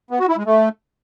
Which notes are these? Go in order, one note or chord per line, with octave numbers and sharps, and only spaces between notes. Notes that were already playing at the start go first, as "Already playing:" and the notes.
B3
F#4
E4
G#3
A3